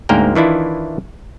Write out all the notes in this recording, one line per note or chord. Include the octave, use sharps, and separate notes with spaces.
D2 G#2 A#3 C#4 A#4 G5
D#3 E3 D4 E4 F4